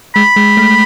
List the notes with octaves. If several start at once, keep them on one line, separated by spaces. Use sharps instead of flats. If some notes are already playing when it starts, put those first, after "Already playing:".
G#3 B5
G#3
A3